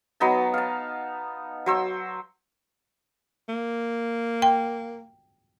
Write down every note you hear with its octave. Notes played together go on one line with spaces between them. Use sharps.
F#3 B3 D#4 A5
F5 A5
F#3 C5 E6
A#3
G5